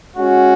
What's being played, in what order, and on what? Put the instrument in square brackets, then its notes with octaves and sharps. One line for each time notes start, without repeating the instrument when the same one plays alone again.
[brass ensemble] G#3 C#4 F#4